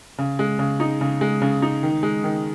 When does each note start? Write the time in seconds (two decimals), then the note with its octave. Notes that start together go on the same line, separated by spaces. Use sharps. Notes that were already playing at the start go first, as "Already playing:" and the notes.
0.18 C#3
0.39 G#3
0.59 C#3
0.80 D#4
1.01 C#3
1.21 G#3
1.42 C#3
1.62 D#4
1.83 D#3
2.03 G#3
2.24 D#3